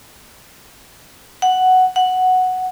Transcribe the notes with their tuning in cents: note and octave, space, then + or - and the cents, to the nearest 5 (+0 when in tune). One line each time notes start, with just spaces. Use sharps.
F#5 +5
F#5 +0